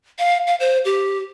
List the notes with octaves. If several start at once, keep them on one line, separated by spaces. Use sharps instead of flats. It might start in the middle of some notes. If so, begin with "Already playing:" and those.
F5
F5
C5
G4